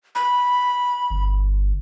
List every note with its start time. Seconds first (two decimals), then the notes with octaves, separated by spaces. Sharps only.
0.15 B5
1.10 G1